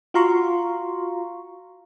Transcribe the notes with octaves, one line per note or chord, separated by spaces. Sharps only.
F4 F#4 F5 A#5 C6 C#6